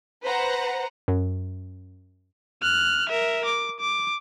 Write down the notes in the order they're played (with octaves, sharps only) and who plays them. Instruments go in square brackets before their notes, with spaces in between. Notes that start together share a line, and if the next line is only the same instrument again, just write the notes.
[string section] B4 C5 F#5 A#5
[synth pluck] F#2
[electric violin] F6 F#6
A#4 E5
D6
D6